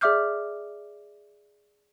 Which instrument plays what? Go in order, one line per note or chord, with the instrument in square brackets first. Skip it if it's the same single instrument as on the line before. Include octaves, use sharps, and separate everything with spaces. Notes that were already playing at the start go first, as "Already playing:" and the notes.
[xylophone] G#4 D5 E5 D6 F6 G6